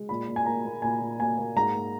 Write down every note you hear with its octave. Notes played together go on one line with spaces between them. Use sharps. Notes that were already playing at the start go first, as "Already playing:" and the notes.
Already playing: G#3
A#2 B5
A#2
G#5
A#3 A#5
A#3
A#2 G#5
A#2
A#3 G#5
A#3
G#2 A#5
A#3